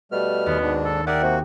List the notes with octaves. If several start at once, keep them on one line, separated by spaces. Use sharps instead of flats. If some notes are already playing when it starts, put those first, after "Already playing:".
B2 G3 A3 F6
D#2 B3
G#2 D4
A4
G4 G#4 A#4 D5 E5 F#5
C3 A#3 F#4